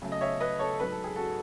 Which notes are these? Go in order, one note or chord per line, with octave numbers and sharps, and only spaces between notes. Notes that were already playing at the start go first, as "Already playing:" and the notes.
C#3 F#3 A3
D#5
C#5 E5
B4 D#5
A4 C#5
G#2 F#3 B3 B4
A4
G#4
F#4 A4